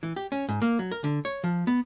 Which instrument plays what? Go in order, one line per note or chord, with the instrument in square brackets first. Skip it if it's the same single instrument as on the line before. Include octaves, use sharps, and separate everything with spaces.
[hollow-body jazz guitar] E3
G4
C#4
G#2
A#3
F#3
A#4
D3
C#5
F3
B3